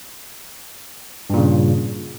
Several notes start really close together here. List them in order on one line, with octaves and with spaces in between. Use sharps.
G2 A#2 C#3